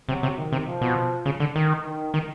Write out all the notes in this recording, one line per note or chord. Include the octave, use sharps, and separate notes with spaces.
C3 F#3
C3
D#3
C3
F3
B2
C#3
D3
D#3
D#3
D#3